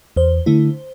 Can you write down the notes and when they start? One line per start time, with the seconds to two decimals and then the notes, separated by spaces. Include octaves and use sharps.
0.16 E2 C5
0.46 D3 A3 E4